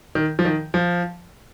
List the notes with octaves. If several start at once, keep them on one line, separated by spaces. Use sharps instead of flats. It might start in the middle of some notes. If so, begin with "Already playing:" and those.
D#3
F3
D#3
F3